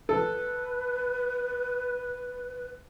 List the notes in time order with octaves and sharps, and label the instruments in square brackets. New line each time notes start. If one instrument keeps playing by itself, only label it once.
[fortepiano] A4 [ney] B4